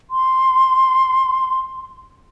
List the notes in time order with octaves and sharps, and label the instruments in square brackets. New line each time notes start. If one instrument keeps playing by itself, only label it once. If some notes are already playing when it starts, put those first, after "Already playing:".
[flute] C6